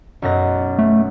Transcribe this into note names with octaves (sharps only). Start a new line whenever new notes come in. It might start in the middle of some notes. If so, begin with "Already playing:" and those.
B1 F#2 A#6
A3